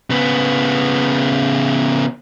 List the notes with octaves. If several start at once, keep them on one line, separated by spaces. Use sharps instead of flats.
C#3 B3